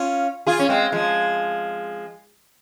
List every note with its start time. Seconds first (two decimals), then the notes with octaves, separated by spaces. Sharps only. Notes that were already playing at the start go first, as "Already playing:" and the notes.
Already playing: C#4 F4
0.47 F4 G#4
0.59 C#4
0.69 G#3 C4
0.92 F3 G#3